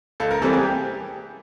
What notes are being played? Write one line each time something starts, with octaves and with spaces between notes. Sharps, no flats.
C#2 A4
A#4
C3 E3 G3 C4 A4
G#4
G4